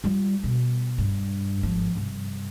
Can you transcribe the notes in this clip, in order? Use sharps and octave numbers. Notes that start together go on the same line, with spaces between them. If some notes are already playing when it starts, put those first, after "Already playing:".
G3 F4
B2
G2
G#1 F3
G2 C3